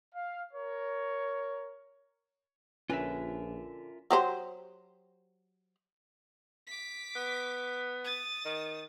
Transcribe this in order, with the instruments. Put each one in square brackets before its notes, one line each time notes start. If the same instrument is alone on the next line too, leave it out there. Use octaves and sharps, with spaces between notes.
[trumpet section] F5
A#4 C#5
[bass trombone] A#1 [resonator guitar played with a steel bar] D3 B4 G#5 [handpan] C#4 [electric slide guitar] F4 A#4 E5
[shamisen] F#3 G4 C5
[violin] D6 B6
[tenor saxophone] B3
[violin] D#6 A6
[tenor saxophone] D#3